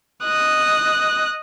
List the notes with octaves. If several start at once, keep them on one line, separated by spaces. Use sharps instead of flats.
D#5 F#6